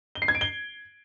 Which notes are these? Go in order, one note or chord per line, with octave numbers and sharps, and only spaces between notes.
G7
C7
G#6
D7
G7